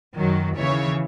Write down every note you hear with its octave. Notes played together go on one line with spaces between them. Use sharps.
F#2 D#3 F#3
D#2 C#3 E3 C#5 E5